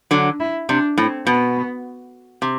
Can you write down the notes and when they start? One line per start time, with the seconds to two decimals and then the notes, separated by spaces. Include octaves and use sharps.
0.11 D3 F#3 D4
0.40 E4
0.69 C3 D4
0.97 A2 C4
1.26 B2 B3
2.42 C3